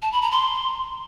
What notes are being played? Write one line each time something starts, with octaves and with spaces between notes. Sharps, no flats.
A5
B5
A#5
C6